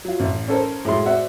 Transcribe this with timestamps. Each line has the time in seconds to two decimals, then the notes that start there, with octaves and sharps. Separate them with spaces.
0.05 F#3 F4
0.20 A1
0.48 C#4 A4 A#4 C5
0.85 A2 F#3 G#3 A3 C6
1.06 C4 F#4 C5 D5 E5 F#5